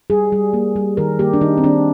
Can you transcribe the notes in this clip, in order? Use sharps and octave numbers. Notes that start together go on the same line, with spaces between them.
G3 G#4
G3
A#3
G3
D#3 A#4
A#3 G4
D4
D#3 D#4
C4
D#3 D4